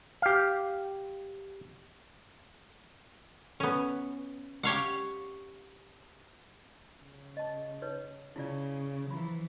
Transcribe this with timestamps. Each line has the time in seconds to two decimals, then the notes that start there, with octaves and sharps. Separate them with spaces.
0.22 G4 F5
3.60 B3 C#4
4.63 G4 C#5 F5 F#5
7.01 C#3
7.37 D#5 A5
7.82 D#4 B4 C#5
8.36 C#3 E4 F4 D5
9.11 E3 F3 A#5 B5